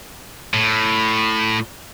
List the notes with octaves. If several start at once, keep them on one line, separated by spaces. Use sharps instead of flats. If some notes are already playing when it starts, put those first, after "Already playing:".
A2